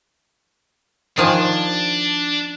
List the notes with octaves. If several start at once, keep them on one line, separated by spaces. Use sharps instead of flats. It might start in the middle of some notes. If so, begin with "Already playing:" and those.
D#3 F3 D4 G#5